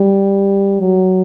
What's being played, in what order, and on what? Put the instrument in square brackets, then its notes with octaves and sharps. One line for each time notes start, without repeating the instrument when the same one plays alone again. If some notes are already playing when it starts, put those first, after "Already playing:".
Already playing: [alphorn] G3
F#3